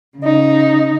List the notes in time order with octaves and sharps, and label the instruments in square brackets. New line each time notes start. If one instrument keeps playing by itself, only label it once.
[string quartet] C#3 D#4